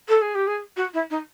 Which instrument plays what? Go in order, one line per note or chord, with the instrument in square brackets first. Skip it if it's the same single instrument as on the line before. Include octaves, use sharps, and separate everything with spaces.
[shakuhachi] A4
G#4
G4
G#4
F#4
E4
D#4